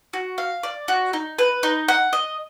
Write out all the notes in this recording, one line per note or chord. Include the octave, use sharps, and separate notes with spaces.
F#4
F5
D5
F#4
D#4
B4
D#4
F#5
D#5